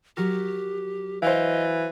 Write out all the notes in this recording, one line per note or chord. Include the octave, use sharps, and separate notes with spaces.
F#3 F#4 G4 A#4
E3 C5 D#5 F5